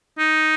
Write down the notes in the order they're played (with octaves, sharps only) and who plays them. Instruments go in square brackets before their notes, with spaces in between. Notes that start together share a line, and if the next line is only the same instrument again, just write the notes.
[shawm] D#4